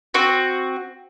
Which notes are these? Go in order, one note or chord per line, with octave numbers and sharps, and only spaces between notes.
C4 F#4